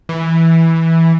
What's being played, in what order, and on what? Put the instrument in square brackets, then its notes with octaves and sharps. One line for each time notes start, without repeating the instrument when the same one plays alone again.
[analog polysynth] E3